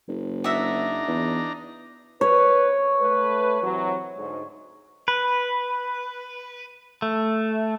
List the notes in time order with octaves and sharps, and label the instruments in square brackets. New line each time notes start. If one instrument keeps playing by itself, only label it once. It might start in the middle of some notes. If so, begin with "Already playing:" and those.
[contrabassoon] F#1
[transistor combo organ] D4 D#4 A#5 [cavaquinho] F#4 E5
[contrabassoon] E2
[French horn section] B4 [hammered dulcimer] C#5
[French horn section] A3 B4
C3 E3 F#3
D2 G#2
[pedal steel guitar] B4
A3